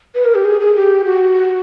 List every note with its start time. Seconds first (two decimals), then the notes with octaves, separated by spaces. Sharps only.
0.15 B4
0.25 A#4
0.35 G4
0.45 G#4
0.60 G#4
0.75 G4
1.05 F#4